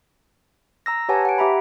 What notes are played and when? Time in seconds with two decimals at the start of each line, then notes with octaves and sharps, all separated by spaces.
0.86 A#5 E6 A#6
1.09 G4 B4 C#5 F#5 G#5 A5
1.25 F#5 D7
1.38 G4 E5 A#5 B5